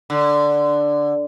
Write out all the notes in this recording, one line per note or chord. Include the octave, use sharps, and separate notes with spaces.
D3